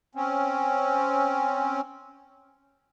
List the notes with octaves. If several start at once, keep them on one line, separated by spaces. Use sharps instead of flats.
C4 C#4